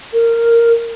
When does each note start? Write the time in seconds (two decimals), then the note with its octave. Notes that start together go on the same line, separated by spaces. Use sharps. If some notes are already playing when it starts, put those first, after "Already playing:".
0.13 A#4